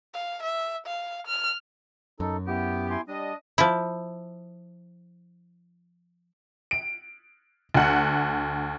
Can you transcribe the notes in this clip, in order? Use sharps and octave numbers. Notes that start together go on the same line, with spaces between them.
F5
E5
F5
F6
F#2 D#4 A4
B3 E4 G4
E4 G#5 C6
G3 D4 D#5
F3 E4
D7
D2 F#5